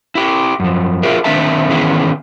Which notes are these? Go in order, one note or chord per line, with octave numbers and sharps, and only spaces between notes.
E4 G4
F#2 F3
F4 F#4 G#4 A#4 E5
D#3 C4 D4 A4 E5 A5
D#3 E3 B3 C#4 E4 G#4